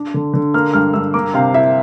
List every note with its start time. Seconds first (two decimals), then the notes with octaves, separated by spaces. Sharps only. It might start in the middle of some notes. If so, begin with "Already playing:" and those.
Already playing: D4
0.14 D3
0.34 D3
0.54 A#3 F6
0.74 G2 F6
0.94 G2 E6
1.14 A#3 D6
1.34 C3 F5
1.54 E4 E5